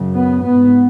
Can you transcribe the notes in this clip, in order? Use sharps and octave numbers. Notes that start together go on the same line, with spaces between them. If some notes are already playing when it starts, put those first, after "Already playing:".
Already playing: F#2 C#3
B3
G#2 B3